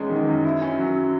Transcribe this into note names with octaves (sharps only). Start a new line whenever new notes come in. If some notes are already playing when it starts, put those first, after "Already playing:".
Already playing: E2 G#3 C#4
D#3
F#2
E4
C#4
F#3